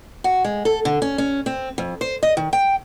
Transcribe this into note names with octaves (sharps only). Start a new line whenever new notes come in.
F#4
G#3
A4
D3
C#4
C#4
C4
F2
C5
D#5
D#3
G5